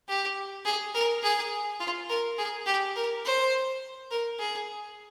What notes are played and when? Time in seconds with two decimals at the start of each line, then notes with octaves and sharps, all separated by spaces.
0.08 G4
0.66 G#4
0.94 A#4
1.23 G#4
1.80 F4
2.09 A#4
2.38 G#4
2.67 G4
2.96 A#4
3.25 C5
4.11 A#4
4.40 G#4